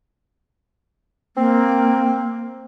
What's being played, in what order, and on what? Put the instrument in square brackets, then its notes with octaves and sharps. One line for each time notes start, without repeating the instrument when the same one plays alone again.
[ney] A#3 [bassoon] C4